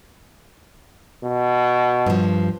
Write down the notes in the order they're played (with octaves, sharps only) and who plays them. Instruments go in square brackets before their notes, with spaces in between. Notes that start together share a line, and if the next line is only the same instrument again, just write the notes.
[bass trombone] B2
[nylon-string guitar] G2 F3